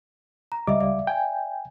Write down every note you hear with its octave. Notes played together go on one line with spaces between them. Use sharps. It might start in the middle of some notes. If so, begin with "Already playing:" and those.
A#5
C#2 G3 D#5 E5 D6
D5 E5 F5
G5 G#5